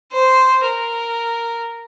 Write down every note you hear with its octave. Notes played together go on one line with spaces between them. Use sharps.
C5
A#4